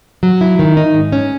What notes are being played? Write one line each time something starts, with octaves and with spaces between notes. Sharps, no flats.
F#3
E4
D#3
D#4
G#2
C#4